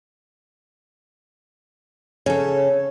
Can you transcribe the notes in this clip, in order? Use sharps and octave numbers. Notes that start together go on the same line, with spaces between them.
C#3 A4 C#5